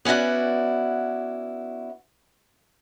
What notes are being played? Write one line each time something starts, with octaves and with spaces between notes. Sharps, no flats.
B3 C#4 E4 F#4 D5